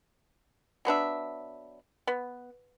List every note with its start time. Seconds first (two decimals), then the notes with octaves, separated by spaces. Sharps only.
0.85 F#3 B3 D4 E5
2.07 B3